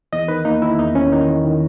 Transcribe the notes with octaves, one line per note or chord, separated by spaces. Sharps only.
E2 D#5
D#3 B4
A#3 D#4
D#3 E4
E2 D#4
E2 C#4
D#3 D#4
D#3
D#3